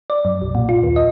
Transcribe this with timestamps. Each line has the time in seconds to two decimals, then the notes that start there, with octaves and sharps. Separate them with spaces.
0.10 D5
0.25 F#2
0.42 B1
0.55 A#2
0.69 F4
0.83 D#2
0.96 D#5